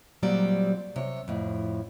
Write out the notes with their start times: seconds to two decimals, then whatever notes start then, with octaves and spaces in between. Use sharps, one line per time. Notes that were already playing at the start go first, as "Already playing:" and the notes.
0.23 A#2 F#3 G3 C4 D5
0.96 C3 C#5
1.28 F2 A2